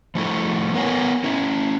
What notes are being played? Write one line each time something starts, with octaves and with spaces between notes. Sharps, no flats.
F3 A3 E4 A4
B3 A#4 C#5 G#5
C#4 E4